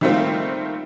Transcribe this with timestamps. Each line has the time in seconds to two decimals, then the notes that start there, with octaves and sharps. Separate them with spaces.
0.01 D#3 G3 A3 A#3 C4 F4